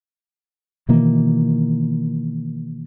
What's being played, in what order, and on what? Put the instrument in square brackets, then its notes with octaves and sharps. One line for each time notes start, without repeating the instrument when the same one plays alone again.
[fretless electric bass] B2 D#3 E3 A#3